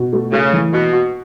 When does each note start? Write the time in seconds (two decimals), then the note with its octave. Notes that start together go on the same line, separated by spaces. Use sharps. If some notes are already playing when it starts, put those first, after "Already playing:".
Already playing: B2
0.13 A3
0.32 C#3 A3
0.53 E3
0.73 B2 F#4
0.93 F#4